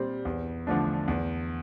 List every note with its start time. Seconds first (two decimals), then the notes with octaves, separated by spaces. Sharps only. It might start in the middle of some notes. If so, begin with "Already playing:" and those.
Already playing: A#2 G3 C4
0.25 E2
0.67 D3 F3 A3 D4
1.08 E2